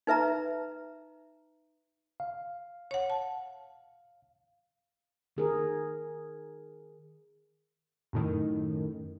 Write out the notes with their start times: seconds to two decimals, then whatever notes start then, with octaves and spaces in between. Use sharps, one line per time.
0.07 D#4 B4 E5 A#5
2.20 F5
2.91 C#5 F#5
3.10 A5
5.37 D#3 G#4 A#4
8.13 F#2 A2 D#3